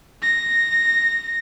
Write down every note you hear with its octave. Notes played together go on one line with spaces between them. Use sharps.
A#6